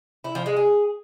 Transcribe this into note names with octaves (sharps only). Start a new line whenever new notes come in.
E4
F3
G#3
G#4